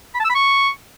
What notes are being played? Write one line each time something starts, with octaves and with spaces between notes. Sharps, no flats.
B5
A5
E6
B5
C#6